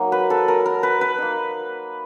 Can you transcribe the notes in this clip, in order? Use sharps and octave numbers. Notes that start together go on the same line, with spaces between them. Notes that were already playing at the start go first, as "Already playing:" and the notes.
Already playing: F#3 A#3 D#4
B4
A4
A#4
A#4
B4
B4
A#3 D#4